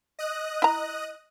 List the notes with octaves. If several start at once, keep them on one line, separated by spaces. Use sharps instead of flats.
D#5 D#6 F#6
E4 A#5